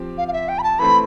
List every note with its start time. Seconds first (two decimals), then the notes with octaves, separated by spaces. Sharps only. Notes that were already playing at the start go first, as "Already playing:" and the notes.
Already playing: F3 C4 G4
0.18 F5
0.28 F5
0.33 E5
0.49 G5
0.59 B5
0.63 A5
0.79 E3 A3 C4 B5